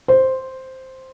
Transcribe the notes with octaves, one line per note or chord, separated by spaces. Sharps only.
C5